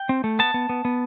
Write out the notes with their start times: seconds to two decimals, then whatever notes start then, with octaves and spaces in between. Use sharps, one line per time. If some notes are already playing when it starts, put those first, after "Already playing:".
Already playing: G5
0.09 C4
0.24 A3
0.39 B3 A5
0.54 B3
0.69 B3
0.85 B3